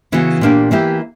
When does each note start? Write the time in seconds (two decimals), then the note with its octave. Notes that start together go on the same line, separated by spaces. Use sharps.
0.12 C#3 E3 B3 F#4
0.41 A#2 A#3 D4 G4
0.71 E3 A#3 E4 G4